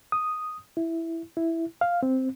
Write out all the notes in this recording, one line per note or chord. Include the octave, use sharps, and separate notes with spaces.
D#6
E4
E4
F5
C4